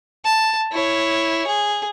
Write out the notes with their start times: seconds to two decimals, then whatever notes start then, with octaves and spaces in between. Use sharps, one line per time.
0.25 A5
0.72 E4 C#5
1.47 G#4